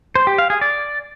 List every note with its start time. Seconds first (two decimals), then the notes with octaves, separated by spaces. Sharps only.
0.15 C5
0.27 G4
0.38 F5
0.50 G#4
0.61 D5